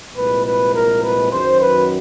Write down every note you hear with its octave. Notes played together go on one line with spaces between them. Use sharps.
C2 A#2 F3 G#3 B4
B4
A#4
B4
F#2 D#3 F#3 C5
B4